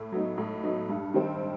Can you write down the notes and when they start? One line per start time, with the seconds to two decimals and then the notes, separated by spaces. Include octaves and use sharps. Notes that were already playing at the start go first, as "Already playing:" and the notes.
Already playing: A2
0.12 F#3 B3 D#4
0.38 A2
0.64 F#3 B3 D#4
0.89 G2
1.14 D#3 G3 C4